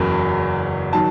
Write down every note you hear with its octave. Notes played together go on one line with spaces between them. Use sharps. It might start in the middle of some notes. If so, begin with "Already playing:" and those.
Already playing: F#1 E2 C#3 F#3
D#3 F#3 A5